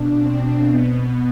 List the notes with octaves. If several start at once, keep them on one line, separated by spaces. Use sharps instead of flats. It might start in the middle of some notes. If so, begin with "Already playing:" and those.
Already playing: B2 D4
C4
B2 B3